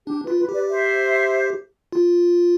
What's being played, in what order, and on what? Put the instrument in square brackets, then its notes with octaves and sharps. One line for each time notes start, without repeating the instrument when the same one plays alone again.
[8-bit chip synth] D4 [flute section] G4
[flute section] B4
[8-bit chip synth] F4
[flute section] B4
[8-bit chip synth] G4 [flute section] B4 D5
[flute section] C5 E5
[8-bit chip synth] F4